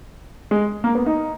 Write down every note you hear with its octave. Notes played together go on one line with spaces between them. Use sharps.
G#3
A#3
B3
D#4